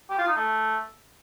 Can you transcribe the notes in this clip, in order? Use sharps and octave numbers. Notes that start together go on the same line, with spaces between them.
G4
F4
D#4
A3